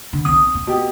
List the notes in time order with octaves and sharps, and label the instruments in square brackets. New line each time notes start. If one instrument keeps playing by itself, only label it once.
[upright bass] D3
[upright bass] B1 C4 [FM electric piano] D#6
[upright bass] C4
[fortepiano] B2 G4